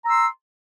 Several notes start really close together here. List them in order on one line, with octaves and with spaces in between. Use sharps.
A#5 E6 C6